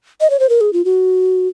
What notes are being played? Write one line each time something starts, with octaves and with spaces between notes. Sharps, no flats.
D#5
C#5
C5
A#4
G#4
F4
F#4